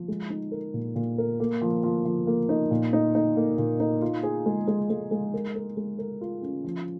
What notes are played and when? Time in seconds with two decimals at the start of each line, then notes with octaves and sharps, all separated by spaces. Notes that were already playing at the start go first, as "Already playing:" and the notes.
Already playing: F3
0.08 G#3
0.30 D#4
0.52 A#4
0.74 A#2
0.96 A#2
1.18 A#4
1.40 A#3
1.61 F3
1.83 F3
2.05 F3
2.27 A#3
2.49 D#4
2.71 A#2
2.93 D#4
3.15 D#4
3.37 A#3
3.58 A#2
3.80 D#4
4.02 F4
4.23 G#4
4.46 G#3
4.68 G#3
4.90 G#3
5.11 G#3
5.34 A#4
5.55 A#4
5.77 G#3
5.99 A#4
6.21 F4
6.42 C#4
6.64 F3